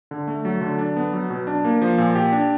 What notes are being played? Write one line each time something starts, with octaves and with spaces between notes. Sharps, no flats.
D3
A3
F#3
D3
D4
B3
F#3
B2
D4
A#3
F3
A#2
G4
D4